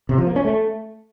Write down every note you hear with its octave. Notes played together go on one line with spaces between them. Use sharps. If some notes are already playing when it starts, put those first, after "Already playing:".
C3
F3
A#3
C#4
A3